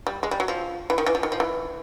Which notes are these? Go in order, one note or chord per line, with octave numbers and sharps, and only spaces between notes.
G3
G#3
G3
F#3
F3
E3
D#3
E3
F3
D#3
F3
E3